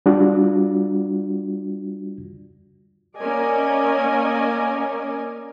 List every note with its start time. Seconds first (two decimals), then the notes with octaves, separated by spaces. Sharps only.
0.06 G3 D4 F4 F#4 D5
3.18 A#3 C#4 A#4 D5 D#5 G#5